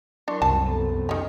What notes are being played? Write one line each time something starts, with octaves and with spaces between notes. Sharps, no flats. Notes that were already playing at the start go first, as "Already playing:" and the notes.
F#3 D4 E4 A#4 C6 C#6
C2 F#2 C3 A5
B3 A4 A#5
D#3 C#4